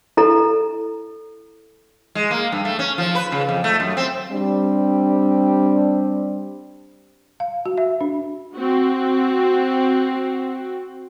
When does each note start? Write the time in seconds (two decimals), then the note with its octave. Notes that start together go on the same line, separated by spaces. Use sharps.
0.17 E4 A4 A#5
2.15 G#3
2.31 A#3
2.52 G2
2.65 A3
2.79 C#4
2.98 F3
3.15 B4
3.32 C#3
3.49 F2
3.64 A3
3.80 F#2
3.97 C4
4.32 G3 C4 D4
7.40 F5
7.66 F#4
7.78 E5
8.01 D4
8.55 C4 F#4